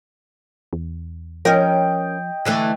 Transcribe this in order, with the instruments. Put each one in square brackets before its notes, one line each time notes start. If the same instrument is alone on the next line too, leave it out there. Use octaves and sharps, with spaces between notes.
[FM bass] E2
[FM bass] F3 [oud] C#4 A#4 [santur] D#5 G5
[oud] D3 E3 A3